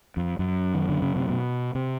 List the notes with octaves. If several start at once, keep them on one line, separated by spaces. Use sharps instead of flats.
F2
F#2
D#3
D3
C#3
C3
B2
C3